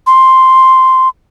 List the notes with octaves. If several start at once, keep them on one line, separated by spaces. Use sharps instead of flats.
C6